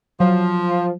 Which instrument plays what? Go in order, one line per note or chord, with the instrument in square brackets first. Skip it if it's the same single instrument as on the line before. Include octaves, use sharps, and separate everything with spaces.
[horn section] F3 [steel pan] F#3